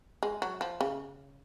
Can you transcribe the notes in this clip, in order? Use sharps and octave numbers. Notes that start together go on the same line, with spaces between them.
G#3
F#3
F3
C#3